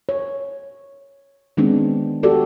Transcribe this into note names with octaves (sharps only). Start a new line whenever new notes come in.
C#5
D#3 G#3 B3 C4 D4
F#4 G4 A4 D5